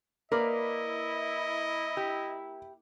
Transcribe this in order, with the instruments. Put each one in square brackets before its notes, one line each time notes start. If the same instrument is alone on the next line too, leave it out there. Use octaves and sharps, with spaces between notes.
[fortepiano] A#3 [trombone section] E4 [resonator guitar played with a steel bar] A#4 B4 D5 [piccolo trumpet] D#5
[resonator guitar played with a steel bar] G4